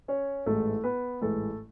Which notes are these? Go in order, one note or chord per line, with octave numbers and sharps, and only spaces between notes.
C#4 C#5
A1 G#2 E3 G#3 A3 A4
B3 B4
A1 G#2 E3 G#3 A3 A4